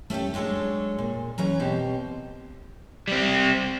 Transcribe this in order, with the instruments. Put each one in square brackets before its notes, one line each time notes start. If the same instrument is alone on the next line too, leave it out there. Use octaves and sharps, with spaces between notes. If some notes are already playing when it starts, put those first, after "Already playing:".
[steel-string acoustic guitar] A3 C#4 F4 G4 A4
F#3 G#3 D4 A4 C#5
A#2
E3 F#3 C#4 A#5
B2 C4 G4
[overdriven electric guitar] G3 C4